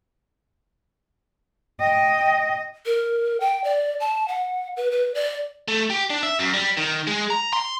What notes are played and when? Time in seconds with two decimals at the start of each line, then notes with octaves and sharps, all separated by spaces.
1.80 D#5 G5
2.86 A#4
3.40 G5
3.64 D5
4.00 A5
4.28 F#5
4.77 B4
4.91 B4
5.15 D5
5.68 A3
5.90 G4
6.10 D4
6.23 E5
6.39 F#2
6.54 G3
6.77 D#3
7.07 G#3
7.30 A#5
7.53 C6